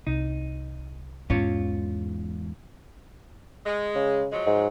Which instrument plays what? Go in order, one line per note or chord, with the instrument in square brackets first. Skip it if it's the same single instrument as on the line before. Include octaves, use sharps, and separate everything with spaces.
[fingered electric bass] C2 [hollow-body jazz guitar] D#4
[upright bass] E2 G#2 [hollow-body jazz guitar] C#4 F4 C#5
[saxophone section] G#3
[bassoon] C#3
[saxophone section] F3 F#3 G#3
[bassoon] G#2